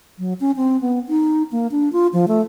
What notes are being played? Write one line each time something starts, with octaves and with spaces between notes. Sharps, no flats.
F#3
C#4
C4
B3
D#4
A#3
D4
F4
F3
A3